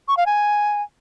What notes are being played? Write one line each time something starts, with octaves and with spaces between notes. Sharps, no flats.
C#6
F5
G#5